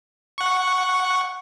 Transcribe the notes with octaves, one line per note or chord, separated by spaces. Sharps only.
F#5 C#6